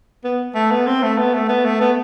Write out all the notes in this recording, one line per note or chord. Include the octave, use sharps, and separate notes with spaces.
B3
A3
B3
C4
A3
B3
A3
B3
A3
B3